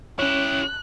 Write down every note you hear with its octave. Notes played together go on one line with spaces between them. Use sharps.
C#4 E4 G4 C#5 F#6